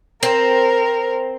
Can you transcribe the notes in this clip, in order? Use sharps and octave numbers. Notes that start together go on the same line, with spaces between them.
C4 A#4